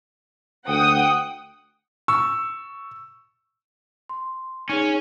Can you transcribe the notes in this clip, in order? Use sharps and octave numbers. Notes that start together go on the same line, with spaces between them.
D2 F#5 G5 D#6
C#6 E6
C6
C#4 D#4 G#4